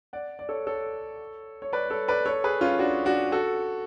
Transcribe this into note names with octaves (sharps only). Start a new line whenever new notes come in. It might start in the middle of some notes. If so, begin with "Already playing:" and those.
D5 F#5
D5
A4 C#5
A4 C#5
C#5
B4 D5
A4 C#5
B4 D5
A4 C#5
G#4 B4
C#4 F4
D4 F#4
D4 F#4
F#4 A4